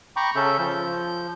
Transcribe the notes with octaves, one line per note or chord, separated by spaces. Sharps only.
G5 A#5 B5 C#6 D6
C#3 C#4 A4 E5 G6
F3 G6